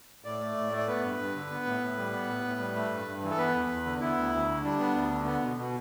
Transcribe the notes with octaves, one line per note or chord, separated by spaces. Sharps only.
A2 D5
A3
A2
A3
D5
B3 B4
G2
G2
D3
B3
A2
A2
G3
B3
A2
A2
G3
A3
G2
G2
E3
A4
B3 B4
E2
E2
D3
B3 E4
D2
D2
D3
G3 D4
B3
D2
D3
B3
B2
B2